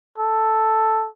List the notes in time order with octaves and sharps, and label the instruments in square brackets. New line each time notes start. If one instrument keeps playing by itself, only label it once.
[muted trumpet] A4